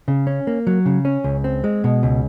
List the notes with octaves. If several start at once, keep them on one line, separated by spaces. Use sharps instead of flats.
C#3
C#4
A#3
F#3
C#3
C#4
C#2
C4
G#3
B2
C#2